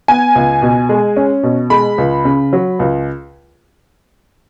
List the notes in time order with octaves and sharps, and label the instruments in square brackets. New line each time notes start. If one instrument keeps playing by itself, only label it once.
[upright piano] B3 G#5
C#2
B2
G#3
C#4
B2
G#3 B5
C#2
C#3
F#3
C#2